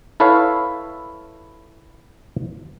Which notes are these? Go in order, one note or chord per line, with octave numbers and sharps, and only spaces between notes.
E4 A4 B4 C#5 F5